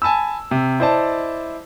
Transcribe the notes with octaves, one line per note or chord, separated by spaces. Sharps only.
G#5 A5 B5 E6
C3
E4 C5 D5 D#5 A5